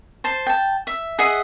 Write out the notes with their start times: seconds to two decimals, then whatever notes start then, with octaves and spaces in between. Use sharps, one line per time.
0.24 C5 A5
0.47 G5 A5
0.87 E5
1.19 G#4 D#5 E5 F#5